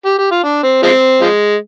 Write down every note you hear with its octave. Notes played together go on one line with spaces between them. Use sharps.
G4
G4
F4
D4
C4
F3 G#3 C4
F3 G#3